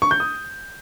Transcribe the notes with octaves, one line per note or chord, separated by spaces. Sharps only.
C#6
G6
D#6